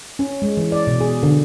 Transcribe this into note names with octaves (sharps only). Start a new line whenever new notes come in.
C#4
G#3
E3
D5
B2
G#4
D3